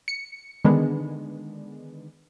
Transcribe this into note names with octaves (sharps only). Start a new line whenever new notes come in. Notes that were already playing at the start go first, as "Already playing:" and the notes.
C#7
D3 D#3 G#3 B3 D4